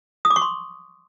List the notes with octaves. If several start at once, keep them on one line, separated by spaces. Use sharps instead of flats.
D#6
D6
C#6
C6